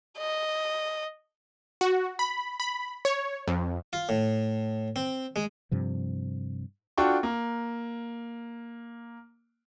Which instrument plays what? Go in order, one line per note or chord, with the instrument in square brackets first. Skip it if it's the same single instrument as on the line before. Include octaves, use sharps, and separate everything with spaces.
[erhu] D#5
[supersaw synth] F#4
B5
B5
C#5
F2
[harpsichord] F4
A2
C4
G#3
[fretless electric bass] G2 C3 F3
[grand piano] D4 F4 F#4 A4 G5 C#6
A#3